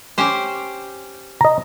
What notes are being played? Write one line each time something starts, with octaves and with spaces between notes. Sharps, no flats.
C#4 G4 C5
D#5 A#5